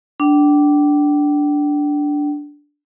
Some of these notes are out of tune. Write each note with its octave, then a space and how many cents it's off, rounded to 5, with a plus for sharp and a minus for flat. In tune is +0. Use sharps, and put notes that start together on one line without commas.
D4 -5 G5 -35